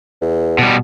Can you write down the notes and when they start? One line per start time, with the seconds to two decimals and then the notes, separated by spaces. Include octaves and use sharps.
0.21 E2
0.58 B2 G3